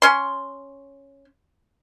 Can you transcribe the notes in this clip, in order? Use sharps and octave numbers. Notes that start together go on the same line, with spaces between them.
C#4 C6